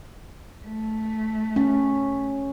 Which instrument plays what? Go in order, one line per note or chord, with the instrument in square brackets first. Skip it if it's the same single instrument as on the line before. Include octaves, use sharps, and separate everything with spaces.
[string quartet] A3
[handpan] C#4